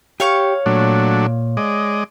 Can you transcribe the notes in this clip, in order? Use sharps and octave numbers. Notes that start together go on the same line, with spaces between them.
G4 C#5 F5 C#6
A#2 F#3 A3 D4
G#3 D5 D#5